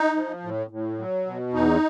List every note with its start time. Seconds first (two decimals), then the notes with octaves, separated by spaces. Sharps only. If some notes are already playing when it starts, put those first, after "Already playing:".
Already playing: D#4
0.16 F3
0.44 A2
0.70 A2
0.99 F#3
1.26 B2
1.53 E2 D#4